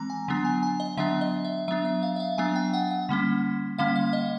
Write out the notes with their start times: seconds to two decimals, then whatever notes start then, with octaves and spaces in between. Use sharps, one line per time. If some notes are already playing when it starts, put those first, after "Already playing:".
Already playing: E3 G#3 C4 A#5
0.10 G#5
0.28 D3 F#3 B3 D4
0.45 G#5
0.63 G#5
0.80 D#5
0.97 D3 F#3 B3 D4 E5
1.21 D#5
1.44 E5
1.68 F#3 B3 D4 E5
1.85 E5
2.03 F5
2.16 E5
2.20 F5
2.38 F#3 B3 D4 G#5
2.56 G5
2.73 F#5
2.90 F#5
3.09 D3 G3 A#3 C#4
3.78 D3 G3 A#3 C#4 F5
3.96 F5
4.13 D#5